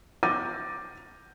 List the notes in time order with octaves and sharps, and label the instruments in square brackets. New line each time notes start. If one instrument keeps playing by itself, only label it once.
[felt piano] D6 G6 A6 A#6 D#7